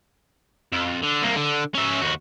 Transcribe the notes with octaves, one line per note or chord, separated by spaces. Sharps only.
F2
D3
C2 A#3
D3
C#4 E5
D#2 F#4